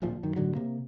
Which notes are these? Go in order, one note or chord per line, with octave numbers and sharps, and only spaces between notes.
D1 A#1 A#2 F3
F#2 D#3
A2 D3 F#3
C3 A#3